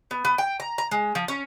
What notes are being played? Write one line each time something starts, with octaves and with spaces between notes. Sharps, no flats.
B3
B3
G5
A#5
A#5
G#3
F3
C#4